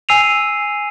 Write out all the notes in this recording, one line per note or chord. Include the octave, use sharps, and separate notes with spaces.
G#5 E6 C7 D#7 F7